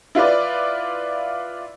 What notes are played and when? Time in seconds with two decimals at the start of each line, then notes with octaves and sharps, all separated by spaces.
0.15 E4 F4 B4 D5